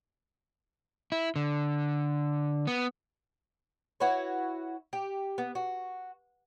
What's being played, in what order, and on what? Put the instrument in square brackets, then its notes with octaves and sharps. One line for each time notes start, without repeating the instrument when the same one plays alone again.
[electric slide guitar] E4
D3
B3
[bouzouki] E4 F#4 B4 C#5
G4
B3
F#4